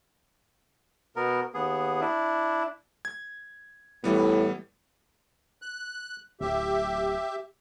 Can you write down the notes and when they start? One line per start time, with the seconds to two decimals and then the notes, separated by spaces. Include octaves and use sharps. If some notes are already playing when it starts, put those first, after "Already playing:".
1.16 B2 B3 A#4
1.54 D#2 B3 G#4
2.01 D4 E4
3.05 G#6
4.04 A2 E3 G3 B3
5.62 F#6
6.41 D1 G4 E5